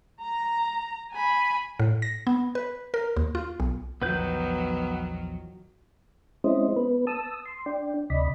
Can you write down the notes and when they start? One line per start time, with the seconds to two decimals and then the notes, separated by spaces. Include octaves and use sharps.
0.21 A#5
1.13 G#5 B5
1.80 A2
2.02 A#6
2.27 B3
2.55 B4
2.94 A#4
3.17 D#2
3.35 F4
3.60 B1
4.02 A#1 E2 D#3 F3 F#3 B3 B4 G6
6.44 G#3 C4 C#4 E4 C5 D#5
6.76 B3 B4
7.07 A5 D#6 E6
7.46 C6
7.66 D4 D5 G5
8.10 D2 C3 D5 D#5 B5